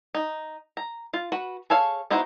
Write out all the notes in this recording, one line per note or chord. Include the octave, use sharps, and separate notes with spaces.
D#4
A#5
F4
F#4 B4
G#4 A4 C#5 F5
B3 D#4 E4 F#4 C5